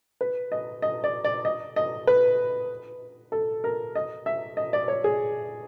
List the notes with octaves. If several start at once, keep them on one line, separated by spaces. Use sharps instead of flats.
B4
D#5
D#5
D5
D5
D#5
D#5
B4
A4
A#4
D#5
E5
D#5
D5
C#5
G#4